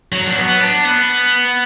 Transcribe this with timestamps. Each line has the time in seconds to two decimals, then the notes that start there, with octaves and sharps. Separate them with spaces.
0.13 F#3
0.26 D4
0.37 B3
0.60 D4
0.85 B3